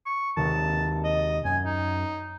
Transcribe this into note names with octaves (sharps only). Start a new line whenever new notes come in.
C#6
D#2 C3 D#3 A5
D#5
F#2 G#5
D#4